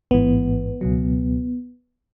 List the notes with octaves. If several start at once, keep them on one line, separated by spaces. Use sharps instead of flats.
A1 G#2 E3 B3
C#2 B2 F#3